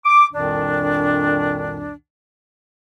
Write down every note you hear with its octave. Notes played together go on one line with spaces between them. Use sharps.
D6
C2 F2 A#2 D#3 D4